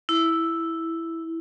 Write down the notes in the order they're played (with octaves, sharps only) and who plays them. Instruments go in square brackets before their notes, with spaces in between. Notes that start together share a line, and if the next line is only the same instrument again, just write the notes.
[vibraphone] E4